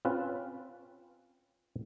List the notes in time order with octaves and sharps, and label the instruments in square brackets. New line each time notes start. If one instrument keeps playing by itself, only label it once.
[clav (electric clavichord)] C4 C#4 F4 B4